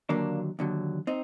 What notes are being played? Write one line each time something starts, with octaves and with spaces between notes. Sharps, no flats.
D#2 D3 F#3 A#3 D4
D#2 D3 F#3
C4 D#4